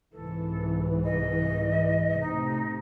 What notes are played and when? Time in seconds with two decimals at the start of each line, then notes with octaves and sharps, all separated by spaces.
0.12 C2 G#2 E3 A4
1.04 D#5
2.20 A2 C3 D#4